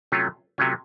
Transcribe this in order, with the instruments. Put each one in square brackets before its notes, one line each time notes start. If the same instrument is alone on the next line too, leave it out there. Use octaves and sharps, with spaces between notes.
[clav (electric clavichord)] C3 F#3 A3 C#4 F4
C3 F#3 A3 C#4 F4